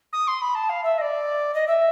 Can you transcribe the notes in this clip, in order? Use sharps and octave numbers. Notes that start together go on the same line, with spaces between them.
D#6
C6
B5
A5
F5
E5
D#5
D5
D#5
E5